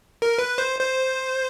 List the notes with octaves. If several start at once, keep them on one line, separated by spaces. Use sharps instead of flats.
A#4
B4
C5
C5